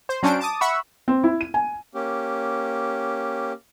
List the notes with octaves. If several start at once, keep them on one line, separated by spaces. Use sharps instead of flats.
C5
F#3 C#4 D4 C5 D7
A5 D6 D#6
E5 F#5 B5 C#6 E6
C4
E4
D#7
G#5
A#3 C#4 G4